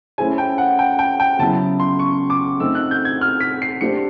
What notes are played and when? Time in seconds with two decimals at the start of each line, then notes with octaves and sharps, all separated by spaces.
0.18 A3 C#4 E4 G#4 C5 G#5
0.38 G5
0.58 F#5
0.79 G5
0.99 G5
1.20 G5
1.39 C#3 F#3 B3 E4 A5
1.80 C6
1.99 C#6
2.30 D6
2.60 A3 C4 D#4 E6
2.75 F#6
2.91 G6
3.05 G#6
3.21 F6
3.41 B6
3.62 C7
3.81 A3 D4 G4 C5 C#7